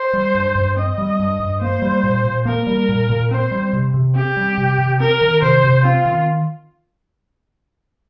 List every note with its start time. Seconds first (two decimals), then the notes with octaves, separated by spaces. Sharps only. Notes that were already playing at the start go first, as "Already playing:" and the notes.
Already playing: C5
0.13 G3
0.35 G2
0.55 G2
0.77 C4 D#5
0.98 G3
1.19 G2
1.40 G2
1.61 A#3 C5
1.82 G3
2.04 A#2
2.24 A#2
2.45 A#3 A#4
2.67 G3
2.89 A#2
3.10 A#2
3.31 C4 C5
3.51 G3
3.73 C3
3.94 C3
4.15 C4 G4
4.37 G3
4.58 C3
4.79 C3
4.99 C4 A#4
5.21 D#3
5.42 C3 C5
5.64 C3
5.84 C4 F4
6.06 D#3